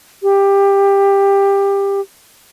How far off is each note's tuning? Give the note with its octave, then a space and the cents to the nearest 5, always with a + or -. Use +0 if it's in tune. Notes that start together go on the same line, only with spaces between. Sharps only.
G4 +15